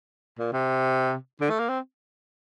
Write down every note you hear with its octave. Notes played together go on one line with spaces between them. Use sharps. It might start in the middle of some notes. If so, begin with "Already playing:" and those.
A#2
C3
D3
A3
A#3
C4